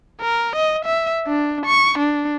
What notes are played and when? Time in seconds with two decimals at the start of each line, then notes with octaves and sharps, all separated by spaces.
0.21 A#4
0.56 D#5
0.85 E5
1.27 D4
1.66 C#6
1.98 D4